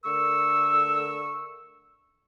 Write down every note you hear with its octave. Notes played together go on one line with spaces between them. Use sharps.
D3 A3 A#4 C#6 E6